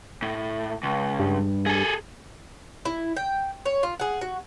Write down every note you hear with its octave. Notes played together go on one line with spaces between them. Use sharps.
A2
C#2
G2
G#4 A4
E4
G5
C#5
F4
G#4 F#5
F#4